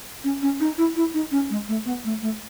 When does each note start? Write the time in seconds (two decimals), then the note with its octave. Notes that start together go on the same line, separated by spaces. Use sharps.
0.24 C#4
0.42 C#4
0.60 D#4
0.78 E4
0.96 E4
1.14 D#4
1.31 C#4
1.50 G#3
1.68 A3
1.85 B3
2.04 A3
2.22 A3